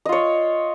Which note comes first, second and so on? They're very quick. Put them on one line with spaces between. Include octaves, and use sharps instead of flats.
D#5 F4 C#5